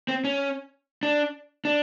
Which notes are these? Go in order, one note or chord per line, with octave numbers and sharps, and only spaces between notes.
C4
C#4
D4
D4